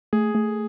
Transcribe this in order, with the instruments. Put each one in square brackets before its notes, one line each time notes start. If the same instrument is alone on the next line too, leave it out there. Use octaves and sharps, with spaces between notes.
[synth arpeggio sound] A3 [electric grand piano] G#4
[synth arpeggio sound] A3